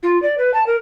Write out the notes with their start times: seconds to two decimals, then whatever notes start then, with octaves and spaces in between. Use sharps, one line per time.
0.03 F4
0.22 D5
0.38 B4
0.54 A5
0.66 A#4